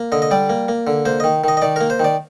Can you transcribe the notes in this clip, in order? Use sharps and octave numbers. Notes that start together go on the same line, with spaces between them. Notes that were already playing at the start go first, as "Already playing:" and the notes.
Already playing: A#3
D3 D#5
D#5
G3 D5
A#3
A#3
D3
A#3 C5
D#3 D#5
D#3 D#5
D#5
D#3 D5
A#3 A#4
C5
D#3 D5